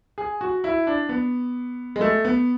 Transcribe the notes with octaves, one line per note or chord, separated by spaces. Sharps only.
G#4
F#4
E4
D4
B3
G#3
A3
B3